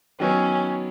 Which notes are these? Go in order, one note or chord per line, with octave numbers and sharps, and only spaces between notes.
D#3 F#3 B3 C#4